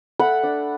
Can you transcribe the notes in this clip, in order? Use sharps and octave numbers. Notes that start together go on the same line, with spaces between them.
A3 F#5 B5
D4